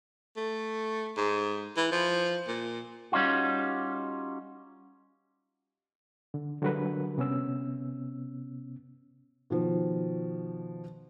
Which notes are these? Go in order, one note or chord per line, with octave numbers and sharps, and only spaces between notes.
A3
G#2
E3
F3
A#2
G3 C#4 D#4 F4 F#4
D3
D3 F#3 G3 F#4 A#4 B4
C3 B3 C#4 E6
B2 D#3 F3